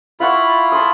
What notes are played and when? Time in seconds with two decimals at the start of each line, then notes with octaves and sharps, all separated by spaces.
0.20 E4 F4 F5 F#5 B5 C#6
0.72 A5 C6 D#6